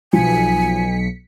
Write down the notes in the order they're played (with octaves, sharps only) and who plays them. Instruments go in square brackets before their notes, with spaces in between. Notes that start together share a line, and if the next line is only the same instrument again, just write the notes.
[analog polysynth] B1 B6 C#7 [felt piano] F3 [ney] G#5